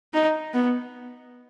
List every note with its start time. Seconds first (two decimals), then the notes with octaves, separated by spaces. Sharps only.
0.14 D#4
0.54 B3